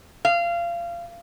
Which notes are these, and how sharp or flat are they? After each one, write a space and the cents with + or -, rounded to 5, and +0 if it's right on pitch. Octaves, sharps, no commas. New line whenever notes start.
F5 -25